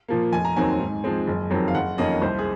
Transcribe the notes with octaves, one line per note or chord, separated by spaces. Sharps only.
A#2 F3 A#3
F1 G#5
A#5
D#2 D#3 F#3 C4 G#5
G#2
F3 G#3 C4
F#1
F2 D#3 F#3 C4
F5
F#1 F#5
F2 D#3 A#3 C#4 D#5
C2 C5
G#4